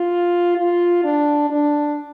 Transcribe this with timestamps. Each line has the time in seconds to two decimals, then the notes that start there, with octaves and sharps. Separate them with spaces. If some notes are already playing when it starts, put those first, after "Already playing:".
Already playing: F4
0.58 F4
1.04 D4
1.50 D4